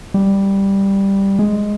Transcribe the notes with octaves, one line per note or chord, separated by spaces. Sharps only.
G3
G#3